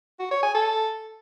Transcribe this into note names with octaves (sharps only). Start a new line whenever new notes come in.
F#4
C#5
G#5
A4